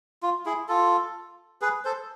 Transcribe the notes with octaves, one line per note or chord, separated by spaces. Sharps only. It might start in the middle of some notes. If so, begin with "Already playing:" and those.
F4
E4 G#4
F4 A4
G#4 B4
A4 C5